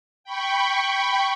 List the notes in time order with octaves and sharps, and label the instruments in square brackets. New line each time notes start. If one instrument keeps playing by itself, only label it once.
[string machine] G5 B5 C#6